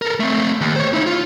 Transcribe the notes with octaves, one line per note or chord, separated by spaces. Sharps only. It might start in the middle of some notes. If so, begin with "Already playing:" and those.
A4 A#4
A3 C4
D#2
C5 C#5
D#4 E4
F4